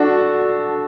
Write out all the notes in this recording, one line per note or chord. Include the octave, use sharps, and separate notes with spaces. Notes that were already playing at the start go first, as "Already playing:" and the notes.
Already playing: D4 F#4 A4